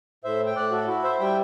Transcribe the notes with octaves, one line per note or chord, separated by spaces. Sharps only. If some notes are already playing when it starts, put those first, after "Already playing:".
A2 C5 E5
G5
A2 D5 F#5
F#4 A4
E4 F#4
C5 E5
G3 E5 G5